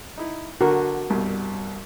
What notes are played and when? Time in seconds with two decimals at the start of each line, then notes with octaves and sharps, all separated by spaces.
0.18 D#4 E4
0.61 D3 F#4 A#4
1.10 C2 G2 B2